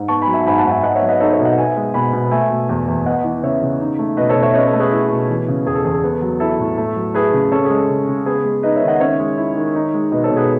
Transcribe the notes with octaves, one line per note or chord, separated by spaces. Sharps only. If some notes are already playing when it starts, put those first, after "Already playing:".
Already playing: G#2
B3 A5 C#6
G#5 B5
F#3
E5 G#5
G#2 G#5 B5
F#5 A5
G#2
E5 G#5
B3 D#5 F#5
C#5 E5
F#3
B4 D#5
D#4 A4 C#5
C#5 E5
B2
D#5 F#5
B3 E5 G#5
G#3
B2 G#5 B5
B2
A3 E5 G#5
B2
E2
E2
B3 D#5 F#5
E3
C#3 C#5 E5
C#3
D#4
A3
B2 B4 D#5
A4 C#5
B2
C#5 E5
C#4 B4 D#5
A4 C#5
A3
G#4 B4
E4
B2
E3
C#3
E2 G#4
A4
E2 G#4
A4
B3
F#3
E4 A4
A2
A3
F#3
E4 G#4 B4
C#3
C#4 A4
G#4
G#3
A4
C#3
C#3
B3 G#4 B4
G#3
D#4 B4 D#5
C#5 E5
D#3
D#5 F#5
C#4 C#5 E5
G#3
E4
D#3
D#4
G#3
B2 B4 D#5
A4 C#5
B2
G#4 B4